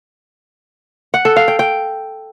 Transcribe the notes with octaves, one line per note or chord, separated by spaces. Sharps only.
F#5
A4
F5
G5
G5